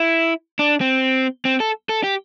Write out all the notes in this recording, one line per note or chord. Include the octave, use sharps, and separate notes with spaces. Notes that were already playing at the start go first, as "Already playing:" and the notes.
Already playing: E4
D4
C4
C4
A4
A4
G4